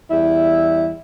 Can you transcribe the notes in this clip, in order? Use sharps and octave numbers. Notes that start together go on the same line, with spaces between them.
E2 G3 E4